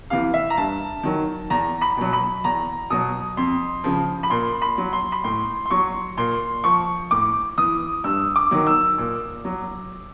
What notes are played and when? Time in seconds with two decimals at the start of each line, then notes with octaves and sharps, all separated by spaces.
0.10 C3 E3 F5
0.34 E5
0.50 A#5
0.57 G2 A5
1.03 D#3 F#3
1.50 E2 A#5
1.81 B5
1.97 B2 F#3
2.13 B5
2.44 E2 A#5
2.90 B2 F#3 D#6
3.37 F2 C6
3.84 C#3 F3
4.23 B5
4.30 A#2 C6
4.62 B5
4.78 F#3
4.93 C6
5.12 B5
5.24 A2 C6
5.66 C6
5.71 F#3 C#6
6.17 A#2 C6
6.64 F3 C#6
7.11 A2 D6
7.58 E3 D#6
8.04 G2 E6
8.36 D6
8.51 D#3 F#3
8.67 E6
8.98 A#2
9.45 F#3